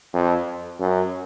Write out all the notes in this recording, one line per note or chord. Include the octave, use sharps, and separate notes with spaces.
F2
F#2